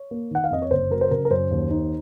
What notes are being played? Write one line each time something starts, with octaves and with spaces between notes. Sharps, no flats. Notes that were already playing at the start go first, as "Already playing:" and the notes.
Already playing: C#5
A#3
D#3 F#5
F5
F2 D#5
C#5
F#1 C5
F#3 A#4
C5
C#3 A#4
A#4
F#2 C5
D#2
D#4